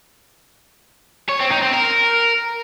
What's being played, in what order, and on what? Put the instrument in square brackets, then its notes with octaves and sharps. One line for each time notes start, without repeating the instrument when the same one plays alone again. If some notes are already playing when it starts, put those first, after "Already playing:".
[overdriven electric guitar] C#5
C4
D#4
C4
A#4